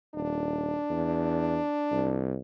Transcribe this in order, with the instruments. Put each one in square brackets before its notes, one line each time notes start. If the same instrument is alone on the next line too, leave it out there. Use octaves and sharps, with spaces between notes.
[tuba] D#1 [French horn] D4
[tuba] E2
C2